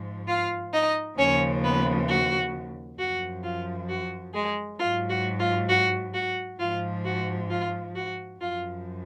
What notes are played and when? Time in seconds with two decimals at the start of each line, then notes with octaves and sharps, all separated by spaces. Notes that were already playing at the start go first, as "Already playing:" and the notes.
Already playing: G#2 F3
0.28 F4 F5
0.73 D#4 D#5
1.18 D#2 C#3 F3 C#4 C#5
1.64 B3 B4
2.09 F#4
2.99 F#2 F3 F#4
3.43 F4
3.89 F#4
4.34 G#3 G#4
4.79 G#2 F#3 F4
5.10 F#4
5.40 F4
5.69 F#4
6.14 F#4
6.59 G#2 F3 F4
7.05 F#4
7.50 F4
7.96 F#4
8.40 F#2 F3 F4